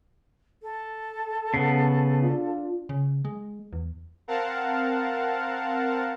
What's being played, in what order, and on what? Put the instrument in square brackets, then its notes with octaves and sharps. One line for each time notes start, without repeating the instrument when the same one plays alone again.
[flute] A4
[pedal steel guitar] C#3 B3
[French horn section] D4 F4
[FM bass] C#3
G#3
E2
[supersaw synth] C4 A#4 F5 F#5 A5